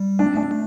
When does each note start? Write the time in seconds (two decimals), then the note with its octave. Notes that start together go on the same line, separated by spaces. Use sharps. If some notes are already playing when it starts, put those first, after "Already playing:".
Already playing: G3
0.19 A3 D4
0.27 C4
0.35 A3 D4
0.43 C4
0.51 A3